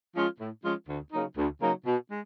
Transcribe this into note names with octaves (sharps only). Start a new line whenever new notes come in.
F3 G#3 C#4 F4
A2
F3 G#3 C#4 F4
D2
C#3 F#3 A#3 D#4
D2
C#3 F#3 A#3 D#4
B2
G#3